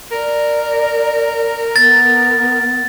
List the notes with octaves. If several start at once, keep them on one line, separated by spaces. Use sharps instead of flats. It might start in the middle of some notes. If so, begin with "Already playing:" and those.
A#4 D5
B3 A6